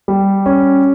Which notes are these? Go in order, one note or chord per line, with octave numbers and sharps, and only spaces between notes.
G3
C#4